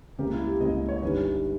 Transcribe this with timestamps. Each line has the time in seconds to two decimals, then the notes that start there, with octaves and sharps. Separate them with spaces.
0.19 C#2 C#3 G3 A#3 G4
0.33 E4
0.47 G4
0.61 C#2 C#3 G3 A#3 D#5
0.75 D#5
0.89 C#5
1.02 G1 G2 D#3 G3 C#4 B4